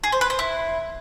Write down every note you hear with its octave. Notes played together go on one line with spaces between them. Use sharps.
G#4
C5
B4
C5
E4